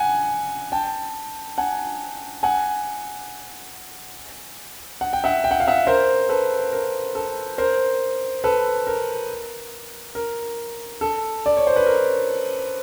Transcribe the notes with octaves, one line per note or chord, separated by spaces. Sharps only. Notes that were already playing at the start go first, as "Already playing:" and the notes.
Already playing: F#5 G#5
G5 A5
F#5 G#5
F#5 G#5
F#5
G5
E5 F#5
G5
F#5
F5
E5 F#5
A#4 C5
A4 B4
A#4
A4
A#4 C5
A4 B4
A#4
A#4
A4
D5
C#5
C5
B4
A#4